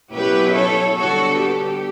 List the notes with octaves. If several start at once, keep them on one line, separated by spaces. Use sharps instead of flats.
B2 F#3 C#4 E4 G4 B4
A4 C#5
D3 G3 B3 F#4 A4
G4